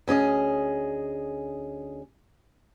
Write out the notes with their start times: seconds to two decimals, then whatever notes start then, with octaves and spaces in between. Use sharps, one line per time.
0.08 D2 C#4 G#4 D#5